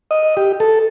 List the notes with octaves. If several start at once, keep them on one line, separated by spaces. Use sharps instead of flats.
D#5
G4
A4